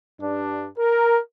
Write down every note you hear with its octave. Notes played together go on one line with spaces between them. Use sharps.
G2 D4
A#4